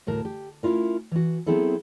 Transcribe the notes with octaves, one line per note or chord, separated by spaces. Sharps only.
D2 A2 A#4 A5
G4
A3 C#4 E4 F4 A#4
E3 F#4
F#3 B3 C4 E4 G#4 A4